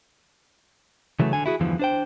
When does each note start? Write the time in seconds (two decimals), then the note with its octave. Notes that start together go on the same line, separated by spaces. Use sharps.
1.20 C#3 E3 F#3 A3
1.33 D3 G#5
1.46 E4 F#4 G#4
1.60 E2 G2 D3 E3 F3
1.79 D4 C5 G5